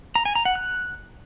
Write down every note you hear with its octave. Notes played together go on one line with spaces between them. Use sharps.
A#5
G#5
A#5
F#5
F#6